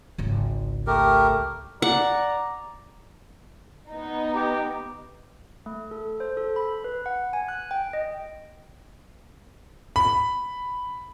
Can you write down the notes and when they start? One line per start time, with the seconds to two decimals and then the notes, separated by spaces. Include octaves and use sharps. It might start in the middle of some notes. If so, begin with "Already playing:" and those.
0.18 G#1 C#2
0.87 A3 G4 A#4
1.82 D5 F#5 A#5
3.91 B3 D#4
4.35 G4
5.66 A3
5.91 A4
6.20 C5
6.37 A4
6.56 B5
6.84 B4
7.06 F#5
7.33 G#5
7.49 F#6
7.71 G5
7.93 D#5
9.96 B5